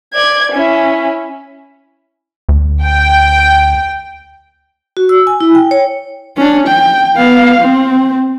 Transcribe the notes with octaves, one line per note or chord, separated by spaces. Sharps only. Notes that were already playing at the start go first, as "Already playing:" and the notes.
D5 G#6
C#4 E4
D2
G5
F#4
E6
G#5
E4
G5
C#5
C#4 D4
G5
B3 F5
C4